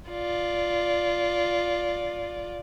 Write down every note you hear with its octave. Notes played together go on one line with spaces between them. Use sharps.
F4 D5